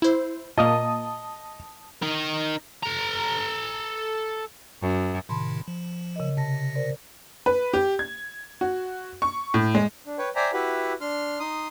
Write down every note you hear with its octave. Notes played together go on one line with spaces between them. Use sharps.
E4 C5
A#2 A#3 D#5 A5 D#6
D#4 A#4
A4 A#5
F#2
A2 C3 D#3 A5 B5 C6
F3
C#3 A#4 D#5
C3 A5 A#6
A#4 C5 D5
B4
G4
G#6
F#4
C#6
A2
G#3
D4
B4 C#5 G5
C5 D5 E5 G5 G#5 A#5
E4 F#4 G4 B4 E5 F#5
D4 C6 F6
D#4 C6 D#6